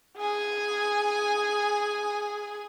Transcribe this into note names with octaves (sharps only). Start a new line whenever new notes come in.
G#4 G#5